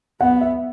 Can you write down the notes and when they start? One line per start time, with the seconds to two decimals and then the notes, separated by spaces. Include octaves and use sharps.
0.21 B3 F#5
0.41 E5